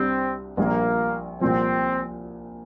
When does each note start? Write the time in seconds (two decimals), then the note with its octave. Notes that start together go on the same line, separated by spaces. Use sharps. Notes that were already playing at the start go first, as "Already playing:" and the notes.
Already playing: C2 C3 G3 C4 D4 G4
0.57 A#1 A#2 G3 A#3
1.41 C2 A#2 F3 C4